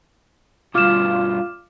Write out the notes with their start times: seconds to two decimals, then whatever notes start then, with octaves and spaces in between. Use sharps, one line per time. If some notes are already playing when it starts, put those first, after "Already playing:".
0.75 G2 B2 F4 D6 F6 E7